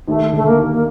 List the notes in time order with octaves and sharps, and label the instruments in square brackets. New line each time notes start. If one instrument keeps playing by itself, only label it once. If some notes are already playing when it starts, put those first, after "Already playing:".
[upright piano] D#2 [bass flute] A3
[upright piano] D3 [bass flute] A3
[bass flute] A#3
[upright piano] D#2
[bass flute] A#3